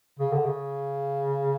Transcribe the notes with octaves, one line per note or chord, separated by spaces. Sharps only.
C#3
D3
C#3